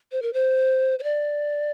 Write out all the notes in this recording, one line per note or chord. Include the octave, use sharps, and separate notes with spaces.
C5
A#4
C5
C5
D5